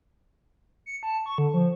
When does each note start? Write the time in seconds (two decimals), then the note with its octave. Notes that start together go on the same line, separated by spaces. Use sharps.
0.86 C#7
1.03 A5
1.26 C#6
1.38 D3
1.54 F3